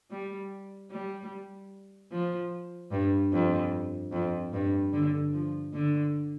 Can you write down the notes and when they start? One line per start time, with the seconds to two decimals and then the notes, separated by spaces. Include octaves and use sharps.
0.11 G3
0.91 G3
2.12 F3
2.92 G2
3.32 F2
4.12 F2
4.53 G2
4.93 D3
5.33 F3
5.73 D3